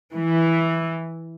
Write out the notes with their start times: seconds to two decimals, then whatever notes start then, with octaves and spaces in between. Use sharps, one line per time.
0.13 E3